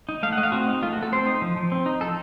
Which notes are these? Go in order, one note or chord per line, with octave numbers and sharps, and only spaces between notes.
D#4
A3 F5
F#5
A3 D#5
F5
C4 F#4
D#4
A3 F4
F#4
A3
A4
C4 C5
D#4
F3
F3
C4
D#4
F3 A4